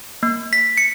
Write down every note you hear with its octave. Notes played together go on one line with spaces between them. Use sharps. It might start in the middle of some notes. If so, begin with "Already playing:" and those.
A#3
B6
C#7